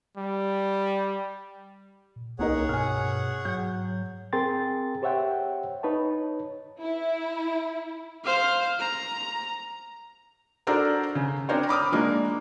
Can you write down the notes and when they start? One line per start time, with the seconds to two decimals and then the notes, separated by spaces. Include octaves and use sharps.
0.17 G3
2.16 A#2
2.39 D1 C2 A#3 D#4 G#4 A#4 C#5 F#5
2.69 G2 B2 G#5 F6
3.45 G#2 F#3 G6
4.33 C4 G#4 A#4 G5 C6 A6
5.02 G4 C5 C#5 E5 F#5 G5
5.83 D#4 B4 C#5 A5
6.80 E4
8.25 C5 F5
8.79 A#5
10.67 D4 F#4 A4 A#4 C5 D5
11.15 C#3
11.49 C4 D4 A#4 C5 C#5
11.69 B5 D6 D#6 F6
11.92 F3 G#3 A#3 D4